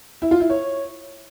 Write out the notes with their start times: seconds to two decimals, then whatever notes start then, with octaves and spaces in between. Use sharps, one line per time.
0.22 E4
0.31 F4
0.40 E4
0.50 C#5